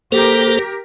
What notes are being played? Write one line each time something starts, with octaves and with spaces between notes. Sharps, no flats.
A#3 G4 A4 A#4 C5